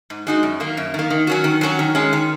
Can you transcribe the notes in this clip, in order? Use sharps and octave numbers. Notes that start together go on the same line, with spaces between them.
G#2
G#3 D#4 F#4
F#2
D#3 A#3
F#2
D#3 A#3
D#3
F#3 C#4 F#4
D#3
F#3 C#4 F#4
D#3
G#3 C#4
D#3